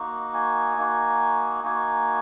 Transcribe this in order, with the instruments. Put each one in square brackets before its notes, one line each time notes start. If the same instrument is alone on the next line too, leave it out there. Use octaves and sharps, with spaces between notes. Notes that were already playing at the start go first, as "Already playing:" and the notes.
Already playing: [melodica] A#3 D#4 F#4
G#5
A#3 D#4 F#4
A#3 D#4 F#4 G#5